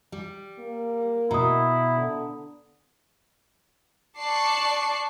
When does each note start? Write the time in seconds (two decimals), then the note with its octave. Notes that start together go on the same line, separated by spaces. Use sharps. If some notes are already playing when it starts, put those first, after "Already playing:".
0.12 G3
0.59 A#3
1.31 B2 E4 A#5 D#6
1.97 D3
4.19 D5 A5 C#6 D6 F#6 C7